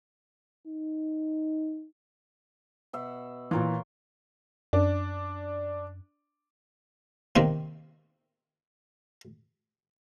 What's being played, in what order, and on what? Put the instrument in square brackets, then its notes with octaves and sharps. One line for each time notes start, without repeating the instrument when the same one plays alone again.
[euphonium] D#4
[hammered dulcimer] B2 E5 F#5
[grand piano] A#2 E3 [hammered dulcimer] F4 A#4 C#5
[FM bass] F#2 [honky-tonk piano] D4
[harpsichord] C3 D#3 A#3 C4